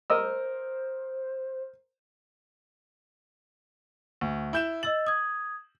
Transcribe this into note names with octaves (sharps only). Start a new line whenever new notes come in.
A#4 C5 D#5 E6
D2
E4 G6 E7
D#5 E6 A6 F#7
D#6 G#6